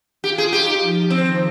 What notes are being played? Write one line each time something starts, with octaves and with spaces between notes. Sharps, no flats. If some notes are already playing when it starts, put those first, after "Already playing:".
F4 G4
G#4
D#4 G4
F3
D#3 C4